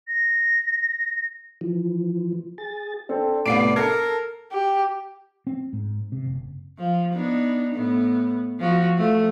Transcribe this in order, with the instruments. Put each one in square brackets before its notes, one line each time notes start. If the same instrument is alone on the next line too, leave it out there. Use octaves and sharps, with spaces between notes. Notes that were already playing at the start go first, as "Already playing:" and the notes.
[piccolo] A#6
[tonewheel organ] E3 F3
G#4 A6
[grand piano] C4 A4 C5 [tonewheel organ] D4
[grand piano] C2 A2 [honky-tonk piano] B3 C7 D7 [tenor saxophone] D5
[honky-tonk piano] A4 [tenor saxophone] A#4 [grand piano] G#6 C7 C#7
[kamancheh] G4
[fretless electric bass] C4
G#2
C3
F#1
[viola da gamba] F3
B3 D4 D#4
A2 B3
F3 F#4
F3 A3